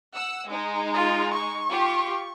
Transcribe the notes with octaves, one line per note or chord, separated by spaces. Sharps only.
F#5 E6
G#3 D#4
F4
C#6
F4 G4